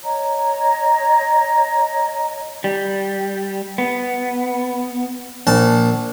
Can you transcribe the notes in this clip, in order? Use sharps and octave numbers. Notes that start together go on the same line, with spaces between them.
C#5 D#5 A#5
G3
B3
A#1 A5